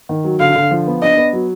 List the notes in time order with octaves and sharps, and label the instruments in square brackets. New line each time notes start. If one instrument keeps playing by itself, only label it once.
[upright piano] D#3
F#3
[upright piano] D3 [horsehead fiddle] F5
[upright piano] D3
F3
B3
[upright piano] D4 [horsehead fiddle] D#5
[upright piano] B3
F#3